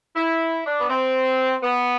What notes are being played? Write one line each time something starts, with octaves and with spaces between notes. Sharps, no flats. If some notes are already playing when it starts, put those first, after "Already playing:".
E4
D4
B3
C4
B3